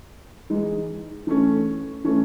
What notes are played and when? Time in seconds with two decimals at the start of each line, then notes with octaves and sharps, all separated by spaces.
0.50 E3 G#3 D#4
1.27 E3 A3 C#4
2.04 E3 A3 C#4